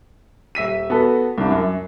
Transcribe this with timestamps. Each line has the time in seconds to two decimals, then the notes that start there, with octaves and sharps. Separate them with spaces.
0.55 D#1 E5 B6 D#7
0.90 B3 F#4 A4
1.38 C2 D4
1.51 F#2